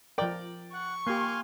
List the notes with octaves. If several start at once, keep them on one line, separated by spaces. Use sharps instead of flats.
F3 A#4 D5 G5
F#5 C#6
A#3 G4 F5 G#5 C6